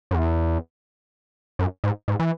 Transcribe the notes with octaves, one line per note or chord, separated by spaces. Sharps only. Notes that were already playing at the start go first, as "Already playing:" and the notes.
F#2
E2
F#2
G#2
G#2
E3